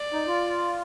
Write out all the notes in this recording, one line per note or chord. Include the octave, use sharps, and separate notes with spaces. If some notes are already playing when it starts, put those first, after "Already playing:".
Already playing: D5
D#4
F4